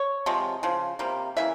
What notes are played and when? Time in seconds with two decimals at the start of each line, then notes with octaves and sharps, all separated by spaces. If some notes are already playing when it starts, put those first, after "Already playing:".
Already playing: C#5
0.26 C3 F3 G#3
0.63 C#3 F3
0.99 C3 G3 A#3
1.37 C#3 E3 A#3 E5